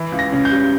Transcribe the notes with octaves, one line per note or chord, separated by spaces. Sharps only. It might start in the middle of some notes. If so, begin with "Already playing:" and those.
Already playing: E3
C#2
A#6
C#3
G6
G3